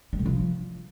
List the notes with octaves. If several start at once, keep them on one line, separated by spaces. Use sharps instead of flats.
G3
C3
F3